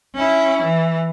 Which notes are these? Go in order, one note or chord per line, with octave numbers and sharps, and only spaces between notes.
C#4 E4
E3